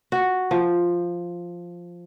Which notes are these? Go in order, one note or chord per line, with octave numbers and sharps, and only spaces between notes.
F#4
F3